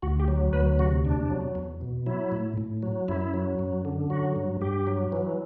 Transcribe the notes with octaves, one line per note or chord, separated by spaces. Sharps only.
D2 F#4
G4
F#3
D2 B4
C3 F#4
E2 D4
F#3
E2
B2
F#3 E4
A2
A2
F#3
F#2 E4
F#3
F#2
D3
F#3 F#4
G2
G2 G4
F#3
E3